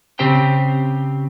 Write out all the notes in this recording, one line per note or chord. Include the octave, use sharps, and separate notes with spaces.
C#3 C4 G4 C5 G5